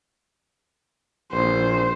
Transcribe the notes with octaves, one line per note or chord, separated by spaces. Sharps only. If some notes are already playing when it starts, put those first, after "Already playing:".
A#1 C5